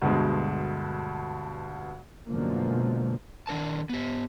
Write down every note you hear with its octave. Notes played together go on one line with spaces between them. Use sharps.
D2 G2 B2 G#3
F#2 B2 D3 F3 G#3 A#3
D#3 D4 A#4 A5
B3 G4